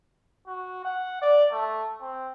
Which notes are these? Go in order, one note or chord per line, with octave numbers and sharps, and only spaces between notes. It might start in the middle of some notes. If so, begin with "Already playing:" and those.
F#4
F#5
D5
A3
C4